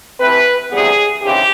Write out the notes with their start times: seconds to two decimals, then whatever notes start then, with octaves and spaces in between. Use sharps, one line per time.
0.19 C3 E3 A3 C4 B4
0.71 D2 C3 E3 G3 B3 G#4
1.22 D#2 C#3 E3 C4 G4